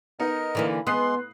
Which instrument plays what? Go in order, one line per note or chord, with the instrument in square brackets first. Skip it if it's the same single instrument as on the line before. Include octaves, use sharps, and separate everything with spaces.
[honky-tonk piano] B3 D#4 [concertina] A#4 D#5
[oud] D3 E3 A#3
[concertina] G#3 C6 [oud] B3 [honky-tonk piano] D#6 F#6 C7